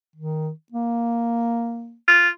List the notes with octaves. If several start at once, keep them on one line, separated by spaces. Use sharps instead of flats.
D#3
A#3
F4